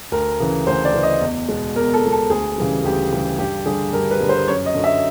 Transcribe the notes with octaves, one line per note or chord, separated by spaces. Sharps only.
D2 A#4
C#3 E3
D2 C5
D5
C#3 E3
D#5
E2
B2 G#3
E2 A#4
A4
B2 G#3
A4
D2 G#4
C#3 E3 G3
D2 G4
C#3 E3 G3
G2 G4
D3 G3 G#4
G2 A#4
B4
D3 G3
C5
F#2 C#5
D#5
D3 F#3
E5